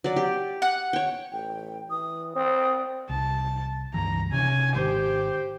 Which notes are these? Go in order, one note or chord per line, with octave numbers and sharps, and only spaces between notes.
F#3 D5
G4
F#5
C#5 G5
A1 G5
E3 D#6
C4 D#6
C2 A5
C#2 G2 E3 A#5
C3 C#4 G#5
G#1 D#3 D4 G4 C5